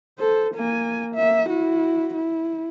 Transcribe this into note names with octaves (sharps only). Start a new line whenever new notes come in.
A4 C5
A#3 G#5
A#3 E5
E4 F#4
E4